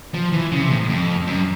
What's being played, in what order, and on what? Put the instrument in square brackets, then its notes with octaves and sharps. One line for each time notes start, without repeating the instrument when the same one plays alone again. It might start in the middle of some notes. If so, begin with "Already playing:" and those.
[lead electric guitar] F3
E3
C#3
C3
A2
F2
F#2